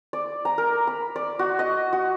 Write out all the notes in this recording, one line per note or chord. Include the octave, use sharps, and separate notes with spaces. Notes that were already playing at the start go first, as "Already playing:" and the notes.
D5
A#5
A#4
B5
D5
F#4
D#5
F#4